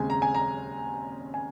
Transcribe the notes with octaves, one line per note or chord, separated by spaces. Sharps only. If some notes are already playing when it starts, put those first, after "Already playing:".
Already playing: D#2 C#3 G#3 C4 G#5
A#5
G#5
A#5
G#5